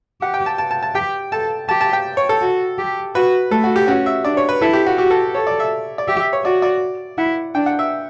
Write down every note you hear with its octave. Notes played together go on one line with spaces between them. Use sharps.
G4 F#5
G5
A5
A5
A5
A5
G4 G5
A4 A5
G4 A5
A5
G5
C#5
A4
F#4
G4
F#4 B4
A3 A4
F#4
G4
C#4 F#4
E5
D4 D5
C#5
B4
E4 A4
G4
F#4
F#4 G4
A4
A4 C#5
D5
E5
D5
G4 E5
E5
C#5
F#4 D5
D5
E4 F#5
D4 G5
F#5
E5